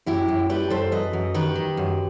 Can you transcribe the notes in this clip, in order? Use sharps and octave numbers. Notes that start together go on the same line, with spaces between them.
F#2 E4 G4
F#2
G3 G4 B4
F#2 A4 C5
F#2 B4 D#5
F#2
D#3 G4 B4
D#3
F#2